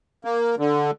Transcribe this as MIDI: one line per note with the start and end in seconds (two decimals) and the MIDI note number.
0.25 0.55 58
0.59 0.91 50